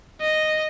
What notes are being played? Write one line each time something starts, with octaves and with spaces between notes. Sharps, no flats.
D#5